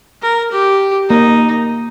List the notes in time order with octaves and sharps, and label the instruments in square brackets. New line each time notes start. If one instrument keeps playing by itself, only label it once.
[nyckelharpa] A#4
G4
[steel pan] A#3 [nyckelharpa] D#4